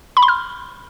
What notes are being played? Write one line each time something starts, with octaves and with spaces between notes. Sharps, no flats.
B5
C6
F6